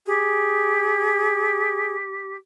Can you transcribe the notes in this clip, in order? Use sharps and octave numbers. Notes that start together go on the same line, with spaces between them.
G4 G#4